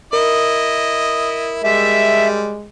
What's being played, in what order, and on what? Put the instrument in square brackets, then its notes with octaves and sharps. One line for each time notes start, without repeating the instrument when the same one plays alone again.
[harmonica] E4 D#5 [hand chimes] A#4
[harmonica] G3 [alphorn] G#3 [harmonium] E5